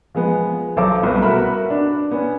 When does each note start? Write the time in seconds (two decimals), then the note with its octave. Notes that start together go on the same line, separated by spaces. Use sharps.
0.15 F3 G#3 B3
0.77 B1 F#3 A4 C5 F5 D6
1.03 C2 B2 A3 B3
1.22 B3 F#4 A#4 E5 B5
1.70 D4
2.11 B3 C#4